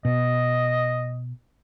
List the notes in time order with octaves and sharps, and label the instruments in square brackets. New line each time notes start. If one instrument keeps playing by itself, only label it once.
[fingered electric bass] B2 [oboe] D#5